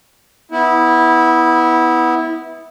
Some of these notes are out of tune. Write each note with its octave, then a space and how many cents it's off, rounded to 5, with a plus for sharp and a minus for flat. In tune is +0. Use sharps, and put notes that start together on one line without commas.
B3 +0 E4 -20